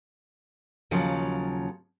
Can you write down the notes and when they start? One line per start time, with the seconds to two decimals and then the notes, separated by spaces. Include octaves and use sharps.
0.91 D#2 C#3 F3 F#3